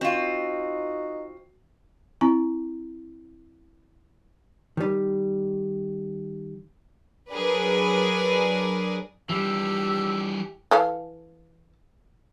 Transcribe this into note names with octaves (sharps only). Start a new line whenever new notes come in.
C4 D#4 F4 F#4
C4 E4 A#5
D#3 G3
F#3 D4 G#4 A#4 B4 D5
E3 F3 G3 D4 G4 E6
E3 A4 F5